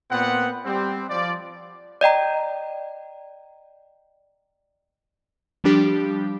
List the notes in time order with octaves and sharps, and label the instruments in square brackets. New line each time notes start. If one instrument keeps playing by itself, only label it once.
[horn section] A#2 B3 C4 F#5
G3 C4
F3 D5
[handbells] D5 D#5 G5 A#5
[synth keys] F3 G3 D4 G4